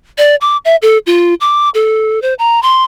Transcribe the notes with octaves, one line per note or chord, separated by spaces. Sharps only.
D5
D6
E5
A4
F4
D6
A4
C5
A#5
C6